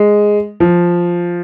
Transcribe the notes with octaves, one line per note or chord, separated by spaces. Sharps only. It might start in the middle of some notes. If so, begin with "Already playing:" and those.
Already playing: G#3
F3